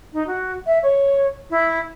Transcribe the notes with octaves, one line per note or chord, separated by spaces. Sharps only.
D#4
F#4
E5
C#5
E4